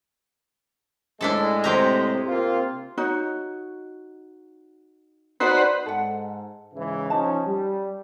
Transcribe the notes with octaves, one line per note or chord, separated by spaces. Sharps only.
A2 G#3 D4 E4 A4
C3 G4 A#5
A#3 C4 F4
D#4 F#4 C#5
D#4 F#4 B4 C5 D5 F#5
G#2 A4 F#5
G#2 C#3 E3
F3 C#4 D#4 A5
G3